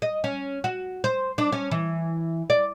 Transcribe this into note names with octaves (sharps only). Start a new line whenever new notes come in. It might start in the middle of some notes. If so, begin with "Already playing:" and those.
D#5
C#4
F#4
C5
D4
C#4
E3
D5